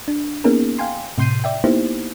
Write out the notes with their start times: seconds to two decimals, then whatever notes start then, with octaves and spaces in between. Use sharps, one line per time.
0.08 D4
0.44 A#3 B3 C#4 D#4 G#4 A#4
0.79 F5 G5 G#5 C6
1.18 A2 C3 C6 G6 C7 D#7
1.44 D5 E5 G5
1.64 A#3 B3 D#4 E4 G4 C5